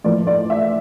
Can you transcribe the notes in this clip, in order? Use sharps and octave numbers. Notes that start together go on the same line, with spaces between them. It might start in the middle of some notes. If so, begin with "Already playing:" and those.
A2 F3 A#3 D5
D5
E5